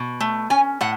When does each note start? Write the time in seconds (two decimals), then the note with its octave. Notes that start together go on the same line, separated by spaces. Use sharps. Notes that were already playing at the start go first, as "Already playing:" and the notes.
Already playing: B2
0.20 A3
0.50 C#4 G#5
0.81 A2 F#5